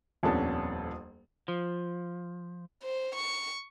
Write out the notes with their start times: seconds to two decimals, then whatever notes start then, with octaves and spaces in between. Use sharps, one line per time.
0.23 D#1 F2 B3 C#4 D4 A4
1.48 F3
2.83 C5
3.15 C#6